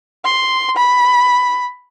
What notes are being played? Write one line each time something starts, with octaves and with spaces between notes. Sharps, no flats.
C6
B5